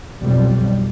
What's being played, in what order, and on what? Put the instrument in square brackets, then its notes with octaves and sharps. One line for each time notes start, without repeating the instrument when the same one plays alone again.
[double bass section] B1 F2 G3